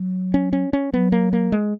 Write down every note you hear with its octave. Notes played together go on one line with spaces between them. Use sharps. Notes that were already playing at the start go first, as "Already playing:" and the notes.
Already playing: F#3
C#4
C#4
C#4
F#3 B3
A#3
A#3
G#3